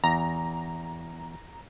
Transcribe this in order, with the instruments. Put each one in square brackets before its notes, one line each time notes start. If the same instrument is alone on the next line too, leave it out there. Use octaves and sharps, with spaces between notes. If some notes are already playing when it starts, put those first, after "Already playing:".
[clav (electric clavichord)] E2 [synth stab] A#5